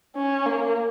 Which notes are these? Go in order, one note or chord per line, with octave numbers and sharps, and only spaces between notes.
C#4
A#3